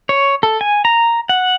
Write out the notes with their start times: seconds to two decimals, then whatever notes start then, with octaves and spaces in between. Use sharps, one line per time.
0.09 C#5
0.43 A4
0.61 G#5
0.85 A#5
1.29 F#5